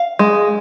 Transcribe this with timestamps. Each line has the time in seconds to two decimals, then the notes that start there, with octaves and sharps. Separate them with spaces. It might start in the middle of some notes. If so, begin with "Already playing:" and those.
Already playing: F5
0.19 G#3